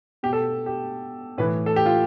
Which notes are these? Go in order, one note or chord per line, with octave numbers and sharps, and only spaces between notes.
B2 G4
A4
G4
A2 E3 B4
A4
G4
F4